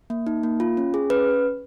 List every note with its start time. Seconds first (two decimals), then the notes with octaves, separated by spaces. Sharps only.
0.10 A#3
0.27 D#4
0.43 A#3
0.60 F4
0.77 C#4
0.94 G#4
1.10 C#4 B4